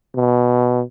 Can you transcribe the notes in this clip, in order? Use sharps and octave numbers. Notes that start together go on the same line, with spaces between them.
B2